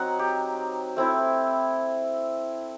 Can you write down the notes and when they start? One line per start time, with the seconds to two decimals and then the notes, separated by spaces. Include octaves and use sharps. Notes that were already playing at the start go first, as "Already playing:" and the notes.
Already playing: F#3 C4 D#4 F#5
0.19 G4
0.97 A3 C4 E4